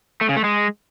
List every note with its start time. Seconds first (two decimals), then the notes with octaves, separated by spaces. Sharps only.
0.21 A3
0.29 C#3
0.37 A3
0.44 G#3